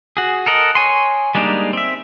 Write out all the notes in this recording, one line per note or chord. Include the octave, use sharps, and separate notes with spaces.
F#4 G#4
A4 A#4 D#5 F#5
C#5 G#5 C6
G3 G#3 A#3 D4 D#4
C4 E5